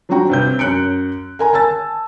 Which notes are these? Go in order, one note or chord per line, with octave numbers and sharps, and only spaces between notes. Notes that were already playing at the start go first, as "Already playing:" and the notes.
F3 F#3 D4 F#4 G5 A#5
G2 C3 G6
F#2 C#4 F#6 C#7 D7
A#4 G#5 A#5
G#5 A5 E6 A6